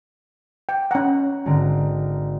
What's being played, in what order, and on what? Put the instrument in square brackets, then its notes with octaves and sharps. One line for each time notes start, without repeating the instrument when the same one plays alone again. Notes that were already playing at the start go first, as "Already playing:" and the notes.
[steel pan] G5
[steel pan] C#4 F#5 [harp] A#5 F#6
[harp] G#1 D3 A#5